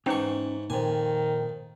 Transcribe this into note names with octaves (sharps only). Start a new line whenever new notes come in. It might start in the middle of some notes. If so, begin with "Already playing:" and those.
G#2 E3 C#4 D#4 G5 C#6
F2 A#2 D#3 G#5